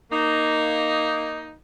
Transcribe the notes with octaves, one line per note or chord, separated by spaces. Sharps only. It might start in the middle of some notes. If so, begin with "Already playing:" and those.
A#3 D#4